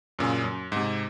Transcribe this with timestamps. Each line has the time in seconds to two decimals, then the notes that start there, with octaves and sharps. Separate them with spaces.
0.19 F#2 A#2 C#3
0.44 F#2
0.72 G#2 C3